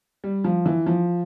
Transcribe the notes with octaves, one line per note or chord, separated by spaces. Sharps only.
G3
F3
E3
F3